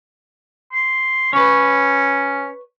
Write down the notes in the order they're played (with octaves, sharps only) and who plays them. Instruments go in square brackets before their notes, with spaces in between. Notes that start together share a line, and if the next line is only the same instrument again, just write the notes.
[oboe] C6
[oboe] C#4 [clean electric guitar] B4 C#5